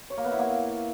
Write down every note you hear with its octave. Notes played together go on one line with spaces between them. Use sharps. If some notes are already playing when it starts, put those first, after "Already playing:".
C#5
A#3
B3
E4
A#3